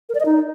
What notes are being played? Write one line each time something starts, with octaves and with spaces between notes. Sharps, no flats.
A#4
D5
D#5
D#4